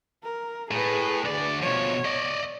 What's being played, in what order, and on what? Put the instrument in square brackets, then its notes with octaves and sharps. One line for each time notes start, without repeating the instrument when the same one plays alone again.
[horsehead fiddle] A#4
[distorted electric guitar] A2 [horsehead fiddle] G#4 B4
[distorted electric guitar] D2 D5
[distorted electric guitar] B2 F3 [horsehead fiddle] C#5
[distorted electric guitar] D5 D#5